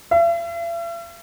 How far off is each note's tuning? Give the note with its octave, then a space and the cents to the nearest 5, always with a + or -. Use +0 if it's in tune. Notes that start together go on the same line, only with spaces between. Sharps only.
E5 +45